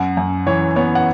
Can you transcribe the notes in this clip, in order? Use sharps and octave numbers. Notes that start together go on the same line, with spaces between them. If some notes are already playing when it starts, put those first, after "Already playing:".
Already playing: F#2 F#5
F#2
E3 C#5
B3 C#5
F#5